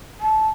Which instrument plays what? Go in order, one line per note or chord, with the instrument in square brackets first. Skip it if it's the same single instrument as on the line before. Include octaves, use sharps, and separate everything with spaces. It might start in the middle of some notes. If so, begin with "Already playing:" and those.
[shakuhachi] A5